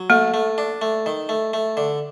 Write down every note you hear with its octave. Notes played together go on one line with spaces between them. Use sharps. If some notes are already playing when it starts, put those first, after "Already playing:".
Already playing: F#3
A3 A#3
A3
D4
A3
D#3
A3
A3
D3